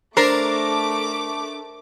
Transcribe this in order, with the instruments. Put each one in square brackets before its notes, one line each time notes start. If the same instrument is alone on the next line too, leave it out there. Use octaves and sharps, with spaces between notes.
[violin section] A3 D6 [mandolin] D4 [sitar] A#4 [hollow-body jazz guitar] C5